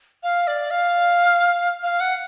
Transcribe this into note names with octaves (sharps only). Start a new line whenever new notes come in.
F5
D5
F5
F5
F#5